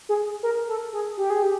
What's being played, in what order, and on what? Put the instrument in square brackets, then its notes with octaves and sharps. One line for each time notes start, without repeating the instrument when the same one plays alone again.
[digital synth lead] G#4
A#4
A4
G#4
G4
G#4
G4